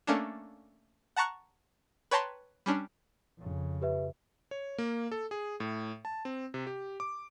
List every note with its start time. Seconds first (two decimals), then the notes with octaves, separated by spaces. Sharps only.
0.07 A3 A#3 C#4 D4
1.16 F#5 A5 A#5 C#6 F#6 C#7
2.11 B4 C#5 G5 A5 A#5 C6
2.66 G3 C#4 D4
3.38 F2 C#3
3.82 G4 B4 E5
4.51 C#5
4.78 A#3
5.12 A4
5.31 G#4
5.60 A2
6.05 A5
6.25 C4
6.54 C3
6.67 G4
7.00 D6